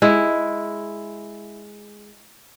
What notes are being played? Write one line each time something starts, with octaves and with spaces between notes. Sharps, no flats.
G#3 E4